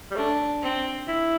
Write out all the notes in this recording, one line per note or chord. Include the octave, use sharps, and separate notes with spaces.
G3
A3 D4
C4
E4